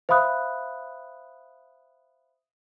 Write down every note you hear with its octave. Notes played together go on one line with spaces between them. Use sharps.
C5 E5 F5 B5 D#6 F#6